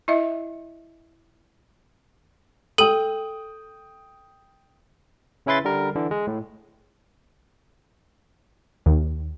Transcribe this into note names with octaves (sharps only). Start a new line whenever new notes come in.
E4 D#5 E5
A4 G5 D#6 D#7 F#7
C#3 C#4 E4 B4 C6 A6
D3 G3 A#4
D3 E3
G#3
A2
D#2